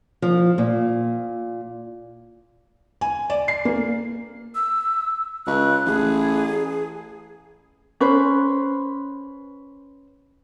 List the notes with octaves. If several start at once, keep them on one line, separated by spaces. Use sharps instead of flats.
F3
A#2
G#5
D5
C7
A#3
E6
C#2 F#6
A1 G#4
C#4 B4 C5